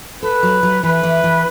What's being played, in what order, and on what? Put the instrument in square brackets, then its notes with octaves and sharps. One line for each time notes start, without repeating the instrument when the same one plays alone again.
[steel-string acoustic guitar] A4 [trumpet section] B4
[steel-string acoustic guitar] F#3
F#3
[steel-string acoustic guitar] E3 [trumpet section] B4
[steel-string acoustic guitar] E3
E3